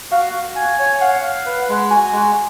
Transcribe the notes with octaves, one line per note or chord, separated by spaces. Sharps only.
F#4 F5
F#4
G#5
C#5
F5 F#5
F5
B4
G#3
F#4 G#5
G#3